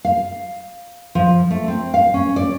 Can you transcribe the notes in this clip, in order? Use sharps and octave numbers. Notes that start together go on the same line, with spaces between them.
F5
F3
A3
C4
F5
C#4
D5